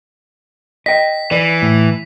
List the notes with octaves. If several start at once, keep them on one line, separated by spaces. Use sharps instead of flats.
D#5 G5 B6
E3 D5
A2